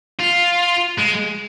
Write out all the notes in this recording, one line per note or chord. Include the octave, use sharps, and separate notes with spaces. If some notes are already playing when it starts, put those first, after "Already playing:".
F4
G#3